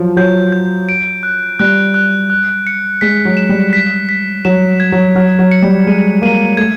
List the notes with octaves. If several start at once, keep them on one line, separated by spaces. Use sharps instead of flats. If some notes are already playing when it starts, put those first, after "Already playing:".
Already playing: F3 F#3
F#3 G6
G6
D7
F#6
G3 F#6
F#6
F#6
C#7
G#3 B6
F#3
E7
G3
B6
B6
F#3 E7
G#6
F#3
F#3 F6
F#3
C#7
G3
G#3 D#7
A#3 D#7
A3 G#6